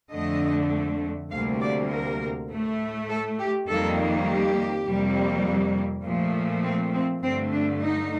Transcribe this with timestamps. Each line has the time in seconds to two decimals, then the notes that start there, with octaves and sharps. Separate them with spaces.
0.13 F2 D3 A3 D#5
1.31 D2 C3 G3 A#3 F5
1.61 D5
1.91 A#4
2.50 A2 A3
3.09 A4
3.39 G4
3.68 F2 D#3 G3 A#3 A4
4.27 G4
4.87 F2 C3 G3 A#3
6.05 A#2 F3 A3
6.64 C4
6.94 C4
7.23 G2 D3 A3 C4
7.53 D4
7.83 D#4